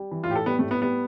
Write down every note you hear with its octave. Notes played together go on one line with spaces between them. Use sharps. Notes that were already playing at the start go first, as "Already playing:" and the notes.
Already playing: G3
E3
F4
A2 G4
A4
G3 B3
A3
A2
B3
G3 B3